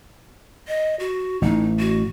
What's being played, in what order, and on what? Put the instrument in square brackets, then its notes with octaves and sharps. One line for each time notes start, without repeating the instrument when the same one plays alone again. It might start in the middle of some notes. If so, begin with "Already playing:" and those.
[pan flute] D#5
F#4
[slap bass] A1 A2 [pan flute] D#4
[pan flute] F#4